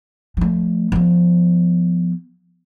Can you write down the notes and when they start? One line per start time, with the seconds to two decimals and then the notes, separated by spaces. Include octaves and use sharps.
0.37 F3 A3
0.92 F3 B3